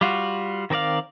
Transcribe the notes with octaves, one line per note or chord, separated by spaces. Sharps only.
G3 F4 F#4
D#3 C4 A#4 D5 F5